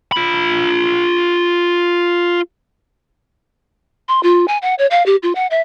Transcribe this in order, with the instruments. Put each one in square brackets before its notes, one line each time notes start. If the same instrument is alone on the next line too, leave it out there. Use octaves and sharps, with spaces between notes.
[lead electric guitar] F4 B5
[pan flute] C6
F4
G#5
F#5
C#5
F5
G4
F4
F#5
E5